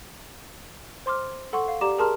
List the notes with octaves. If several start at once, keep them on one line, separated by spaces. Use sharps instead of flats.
C5 C6 D6 F6
A4 F#5 C6 C#6
F5
G4 D5 A#5 D6 E7
G#4 A#4 A5 A#5 C6 F6